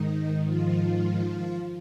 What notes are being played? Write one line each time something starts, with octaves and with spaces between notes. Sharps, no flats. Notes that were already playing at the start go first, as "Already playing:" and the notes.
Already playing: G#2 D#3 D#4
F3 F4